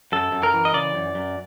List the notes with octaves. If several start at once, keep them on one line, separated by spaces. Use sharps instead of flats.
F#2 A4
F#2
A#4
E3
D#5
C#3 D5
F#2
F#2